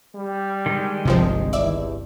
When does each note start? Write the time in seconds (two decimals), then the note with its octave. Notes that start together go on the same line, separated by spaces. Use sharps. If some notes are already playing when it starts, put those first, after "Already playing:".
0.16 G3
0.66 D#3 G#3
1.05 G1 C2 G2 C3 F3 C4
1.53 E2 D5 E5